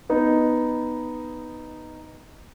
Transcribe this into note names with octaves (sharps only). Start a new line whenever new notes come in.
B3 D#4